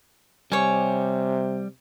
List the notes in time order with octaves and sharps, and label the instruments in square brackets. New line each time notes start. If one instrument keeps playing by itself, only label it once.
[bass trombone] C3 [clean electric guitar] G3 [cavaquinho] C#5 G#5